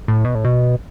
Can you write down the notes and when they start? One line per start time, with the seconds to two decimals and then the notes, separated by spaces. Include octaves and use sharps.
0.08 A2
0.25 B2
0.35 A2
0.45 B2